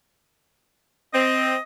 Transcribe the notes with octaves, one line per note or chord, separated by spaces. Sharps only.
C4 D#5